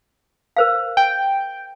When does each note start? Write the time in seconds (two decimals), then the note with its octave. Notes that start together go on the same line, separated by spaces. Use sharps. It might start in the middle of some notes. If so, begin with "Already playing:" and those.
0.57 A#4 C5 F5
0.97 G5